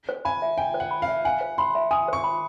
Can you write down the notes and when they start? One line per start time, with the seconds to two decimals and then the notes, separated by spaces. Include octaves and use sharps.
0.09 C5
0.25 G#5 B5
0.42 E5
0.58 G5 G#5
0.74 C5
0.80 F#5
0.91 B5
1.02 F5
1.08 E5
1.25 F#5 G#5
1.41 C5
1.58 B5 C6
1.75 E5
1.91 G#5 D#6
2.08 C5 C#6
2.24 B5